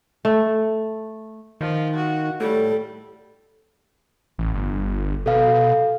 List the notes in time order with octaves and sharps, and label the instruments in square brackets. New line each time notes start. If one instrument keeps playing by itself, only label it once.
[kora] A3
[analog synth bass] D#3 [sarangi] F3
[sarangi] F#4
[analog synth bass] A2 [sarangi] G3 [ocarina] A4
[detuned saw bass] A1
G1
[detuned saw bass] B2 [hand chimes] A4 F5